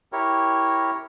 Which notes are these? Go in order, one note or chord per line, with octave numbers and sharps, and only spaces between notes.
E4 G4 A#4 C#5